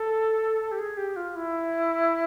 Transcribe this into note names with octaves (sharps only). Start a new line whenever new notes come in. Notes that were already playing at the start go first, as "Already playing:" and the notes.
Already playing: A4
G4
G#4
G4
F4
E4